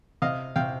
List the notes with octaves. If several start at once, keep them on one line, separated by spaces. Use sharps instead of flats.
C3 D#5 F5
C3 F5 G5